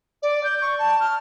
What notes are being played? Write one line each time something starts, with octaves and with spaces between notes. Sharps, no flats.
D5
G6
C#6
A5
F6